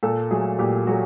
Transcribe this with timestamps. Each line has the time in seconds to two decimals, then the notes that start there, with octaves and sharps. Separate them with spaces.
0.03 A#2 A4
0.31 F#3 A3 G#4
0.59 A#2 G4
0.87 F#3 A3 F#4